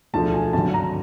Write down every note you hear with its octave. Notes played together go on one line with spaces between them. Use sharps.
E1 D2 D3 F3 A5
G#5
G#1 G2 D3 F#3 A5
A#5